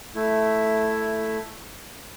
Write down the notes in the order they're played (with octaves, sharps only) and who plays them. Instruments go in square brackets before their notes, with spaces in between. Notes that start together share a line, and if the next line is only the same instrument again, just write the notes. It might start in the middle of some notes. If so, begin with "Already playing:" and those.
[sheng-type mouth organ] A3 E4